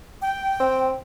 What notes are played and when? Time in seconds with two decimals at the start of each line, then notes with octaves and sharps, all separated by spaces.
0.22 G5
0.60 C4